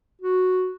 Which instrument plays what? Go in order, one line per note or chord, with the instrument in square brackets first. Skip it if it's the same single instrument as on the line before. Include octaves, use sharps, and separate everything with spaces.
[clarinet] F#4